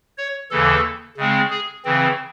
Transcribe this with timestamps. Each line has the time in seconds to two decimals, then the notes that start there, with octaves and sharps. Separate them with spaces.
0.18 C#5
0.51 D#2 C#3 E3 A4
1.17 C#3 G#3 C4
1.50 G#4
1.85 C#3 E3 C4